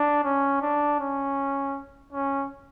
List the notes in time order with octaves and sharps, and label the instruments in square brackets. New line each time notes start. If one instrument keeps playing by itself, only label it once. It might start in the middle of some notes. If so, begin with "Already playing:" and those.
Already playing: [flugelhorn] D4
C#4
D4
C#4
C#4